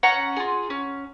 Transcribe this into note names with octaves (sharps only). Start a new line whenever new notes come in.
C#4 F#5 A#5
F4 G#4
C#4